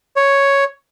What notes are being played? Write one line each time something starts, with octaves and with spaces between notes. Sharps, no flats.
C#5